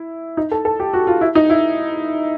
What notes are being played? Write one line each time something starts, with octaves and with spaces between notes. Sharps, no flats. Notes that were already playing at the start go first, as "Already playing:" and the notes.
Already playing: E4
D#4
A4
A4
G4
F#4
F4
E4
D#4
E4